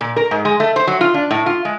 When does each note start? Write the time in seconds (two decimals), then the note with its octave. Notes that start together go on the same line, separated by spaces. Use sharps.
0.01 A#2
0.16 A#4
0.31 G#2
0.45 G#3
0.60 A3
0.76 C5
0.87 F#3
1.01 F4
1.14 D4
1.31 A2
1.46 F4
1.65 G#3